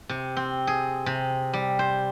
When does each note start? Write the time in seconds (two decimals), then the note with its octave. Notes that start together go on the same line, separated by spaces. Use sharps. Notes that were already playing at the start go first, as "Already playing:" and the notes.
0.09 C3
0.37 C4
0.67 G#4
1.06 C3
1.53 G3
1.79 C5